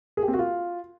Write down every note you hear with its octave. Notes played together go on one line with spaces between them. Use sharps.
G#4
G4
C4
F#4
F4